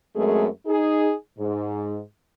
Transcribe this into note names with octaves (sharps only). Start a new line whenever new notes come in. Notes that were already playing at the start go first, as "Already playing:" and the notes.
F#2 G#3 A3 C4 G#4 A#4
D#4 G#4
G#2